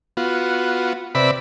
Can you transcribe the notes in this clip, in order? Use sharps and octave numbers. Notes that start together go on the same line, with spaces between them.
B3 F4 F#4
C3 B4 D5 E5 B5